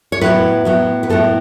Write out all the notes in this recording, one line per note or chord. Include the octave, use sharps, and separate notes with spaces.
C#5
A2 F#3 B3 B4
A2 F#3 B3
B4
A2 F#3 B3 A4